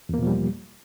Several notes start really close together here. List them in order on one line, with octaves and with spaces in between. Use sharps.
E2 A#3 B2 F3 G3